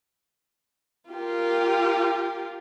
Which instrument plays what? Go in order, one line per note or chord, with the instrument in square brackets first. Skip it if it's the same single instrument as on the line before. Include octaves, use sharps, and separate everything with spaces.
[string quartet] F4 G4 A#4